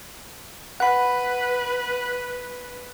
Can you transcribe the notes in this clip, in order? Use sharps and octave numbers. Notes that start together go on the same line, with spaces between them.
B4 F#5 B5